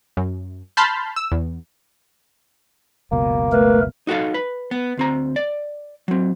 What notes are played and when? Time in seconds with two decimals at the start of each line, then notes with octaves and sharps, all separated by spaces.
0.17 F#2
0.77 A5 B5 C6 F6 G6
1.16 E6
1.32 E2
3.11 F#1 C#2 B2 A#3
3.53 A3 A#4 B4
4.07 D#4 F#4 A4 F5
4.34 B4
4.71 B3
4.97 D2 C4 A#5
5.36 D5
6.08 F#3 C4